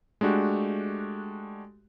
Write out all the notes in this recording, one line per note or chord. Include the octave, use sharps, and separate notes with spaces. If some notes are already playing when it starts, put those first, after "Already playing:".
G#3 A3 D4 F#4 G4